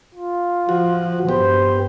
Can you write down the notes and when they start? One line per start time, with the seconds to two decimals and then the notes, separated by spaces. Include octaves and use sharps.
0.15 F4
0.69 F3 F#4
1.29 G2 B3 G4 C5